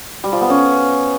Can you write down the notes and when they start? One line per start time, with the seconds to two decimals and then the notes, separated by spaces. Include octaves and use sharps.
0.24 G3
0.33 F3
0.41 B3
0.50 C#4